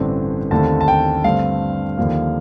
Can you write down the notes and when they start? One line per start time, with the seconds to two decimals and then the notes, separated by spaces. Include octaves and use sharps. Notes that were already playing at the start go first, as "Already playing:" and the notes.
Already playing: A1 G2 D3 A3 C4
0.51 D#2 D3 A3 C4 A5
0.81 A5
0.88 G5
1.24 G2 D3 A3 C4 F5
1.97 D#2 D3 F3 A#3